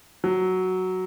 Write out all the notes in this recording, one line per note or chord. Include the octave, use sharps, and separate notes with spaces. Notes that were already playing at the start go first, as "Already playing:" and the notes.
F#3